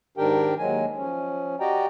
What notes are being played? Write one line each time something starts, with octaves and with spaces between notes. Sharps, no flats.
G#2 D#3 D4 G4 A#4 G5
D#2 F#3 G#3 G#5
F3 C#4
F#4 G4 D5 D#5 G5 A#5